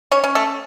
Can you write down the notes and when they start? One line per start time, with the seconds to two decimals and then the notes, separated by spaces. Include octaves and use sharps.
0.11 C#4 C#5
0.24 C#4
0.35 A3 A4